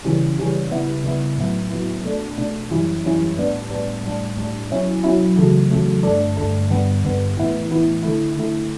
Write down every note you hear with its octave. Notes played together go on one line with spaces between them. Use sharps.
C#3 E3 G3 C#4
C#3 E3 G3 C#4
C#3 G3 B3 E4
C#3 G3 B3 E4
A2 F#3 B3 E4
A2 F#3 B3 E4
B2 A3 D4
B2 A3 D4
F#2 E3 G3 C#4 E4
F#2 E3 G3 C#4 E4
A2 G3 B3 D4
A2 G3 B3 D4
A2 G3 D4
A2 G3 D4
B2 F#3 C#4 E4
B2 F#3 C#4 E4
E2 C#3 F#3 A3
E2 C#3 F#3 A3
G2 D3 A3 D4
G2 D3 A3 D4
G2 D3 G3 B3
G2 D3 G3 B3
A2 E3 B3 E4
A2 E3 B3 E4
D3 A3 E4
D3 A3 E4